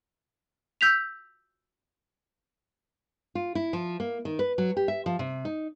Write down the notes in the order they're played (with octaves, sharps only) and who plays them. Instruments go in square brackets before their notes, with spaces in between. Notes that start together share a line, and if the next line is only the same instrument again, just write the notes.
[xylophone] E6 G6 B6 F7
[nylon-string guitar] F4
E4
F3
A#3
D#3
B4
F#3
G4
E5
F3
C3
D#4